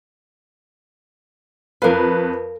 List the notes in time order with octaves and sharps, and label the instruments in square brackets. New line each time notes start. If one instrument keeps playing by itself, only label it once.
[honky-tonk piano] F2 B4 [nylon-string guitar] A#4 F5